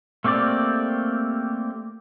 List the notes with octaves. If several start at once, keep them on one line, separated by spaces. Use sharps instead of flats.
A3 A#3 C4 G4 D5